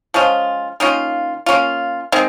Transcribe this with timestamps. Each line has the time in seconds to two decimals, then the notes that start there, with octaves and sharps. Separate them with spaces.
0.14 F3 G#3 C#4 F4
0.80 D#3 A#3 C#4 F4
1.46 A#3 C#4 F4
2.12 D#3 G#3 C4